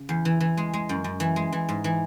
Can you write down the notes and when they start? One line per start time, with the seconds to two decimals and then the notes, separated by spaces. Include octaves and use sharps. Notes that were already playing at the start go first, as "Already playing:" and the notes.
Already playing: C#3
0.09 E2
0.25 E3
0.40 E3
0.57 G#3
0.73 G#3
0.89 F#2
1.04 F#2
1.20 E3
1.36 G#3
1.52 E3
1.69 G#2
1.84 E3